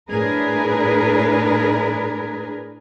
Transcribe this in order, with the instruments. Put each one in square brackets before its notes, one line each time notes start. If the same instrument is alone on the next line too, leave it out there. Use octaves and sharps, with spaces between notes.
[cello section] A2 D4 G#4 A#4 B4